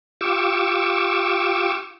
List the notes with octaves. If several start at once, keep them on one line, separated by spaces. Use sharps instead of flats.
F4 G4 C#6 D6 E6